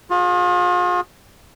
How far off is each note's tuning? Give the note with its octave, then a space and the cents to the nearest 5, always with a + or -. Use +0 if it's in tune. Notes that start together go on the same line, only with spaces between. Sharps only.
F4 +40 G#4 +0